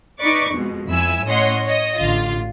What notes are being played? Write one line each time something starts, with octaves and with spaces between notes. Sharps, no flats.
D#4 B4 D5 C#6 D6
F2 B2 G#3
F2 E4 G#5 E6
A2 C#4 C#5 D#5 F#5 C6
C#5 D#5
A1 D3 F4